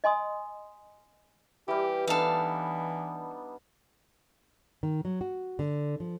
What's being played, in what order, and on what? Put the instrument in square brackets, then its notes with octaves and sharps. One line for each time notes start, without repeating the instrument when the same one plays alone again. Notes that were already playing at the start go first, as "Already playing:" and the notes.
[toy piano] D#5 G#5 C6 D#6
[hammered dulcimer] E3 G3 [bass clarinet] G4
[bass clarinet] E3 [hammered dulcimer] B3 D4 D#4 [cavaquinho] A4 F5
[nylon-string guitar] D#3
F#3
F#4
D3
F3